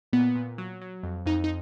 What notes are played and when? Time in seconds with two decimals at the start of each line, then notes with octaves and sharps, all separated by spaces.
0.13 A#2 B3
0.35 A#2
0.58 F#3
0.81 F#3
1.03 F2
1.26 F2 D#4
1.44 D#4